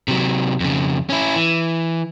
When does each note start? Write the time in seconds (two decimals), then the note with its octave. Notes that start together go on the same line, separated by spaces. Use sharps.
0.08 C3 F#3
0.60 F2 C#3
1.10 C#4 E4
1.36 E3